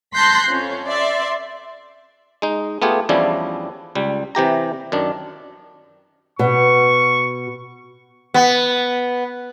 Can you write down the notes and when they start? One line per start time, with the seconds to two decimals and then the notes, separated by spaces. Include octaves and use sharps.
0.16 A5 C6 F#6 G6 A#6 B6
0.49 F2 C#4
0.86 D5 E5 C6
2.42 G#3 D#4
2.82 A3 B3 F4 G4 G#4
3.09 E2 F3 G3 C#4 D4 E4
3.95 C#2 G3
4.35 C3 E3 G4 A#5
4.92 F#2 D#3 D4
6.39 B2 C#6
8.34 B3